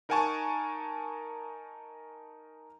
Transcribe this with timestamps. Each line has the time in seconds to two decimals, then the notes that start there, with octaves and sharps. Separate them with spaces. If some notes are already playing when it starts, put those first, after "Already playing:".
0.09 D#4 A#4 F#5 G#5 A5 C#6